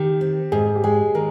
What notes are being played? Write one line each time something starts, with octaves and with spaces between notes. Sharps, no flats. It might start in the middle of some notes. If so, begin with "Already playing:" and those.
Already playing: D#3 G4
C4
G#2 G#4
G4
G#3 G#4
D#3 A#4